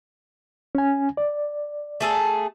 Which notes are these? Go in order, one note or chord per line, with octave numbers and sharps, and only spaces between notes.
C#4 G#5
D5
A3 G#4 A4